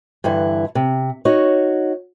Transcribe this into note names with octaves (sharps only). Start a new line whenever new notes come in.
G2 D3 E3 E4
C3
D#4 F#4 C#5